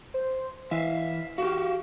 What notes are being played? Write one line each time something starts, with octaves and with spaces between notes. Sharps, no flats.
C5
E3 E5 F5
F#4 G4 F5